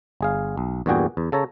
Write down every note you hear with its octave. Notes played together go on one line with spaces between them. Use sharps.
G1 G#4 F5
B1
E2 G2 A#2 F#4 G#4 G5
E2
C#3 A4 C#5 A#5